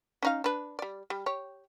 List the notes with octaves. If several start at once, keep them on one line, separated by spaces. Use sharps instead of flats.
C#4 D#4 F5
D4 B4
G3 D5
G3
G4 C#5